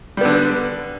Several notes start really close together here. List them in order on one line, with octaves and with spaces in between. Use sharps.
G3 B3 D3